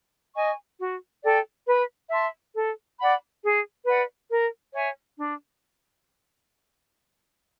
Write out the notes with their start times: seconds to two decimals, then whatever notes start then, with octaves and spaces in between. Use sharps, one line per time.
0.34 D#5 G#5 C#6
0.79 F#4
1.23 A4 D5 G5
1.67 B4
2.10 E5 A5 C6
2.54 A4
2.99 D5 F#5 B5
3.43 G#4
3.86 B4 D5 F#5
4.30 A#4
4.74 C#5 E5 G#5
5.18 D4